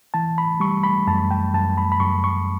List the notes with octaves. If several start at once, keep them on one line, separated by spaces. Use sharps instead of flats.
E3 A5
B5
G3 C#6
B5
F#2 A5
G5
F#2 A5
B5
B5
F#2 C#6
C#6